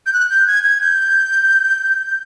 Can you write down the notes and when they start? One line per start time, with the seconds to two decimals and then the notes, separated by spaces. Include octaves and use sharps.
0.06 G6
0.14 F#6
0.30 G6
0.47 G#6
0.64 G#6
0.81 G6